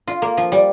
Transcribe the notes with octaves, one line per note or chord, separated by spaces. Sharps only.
F4
A#3
F3
G3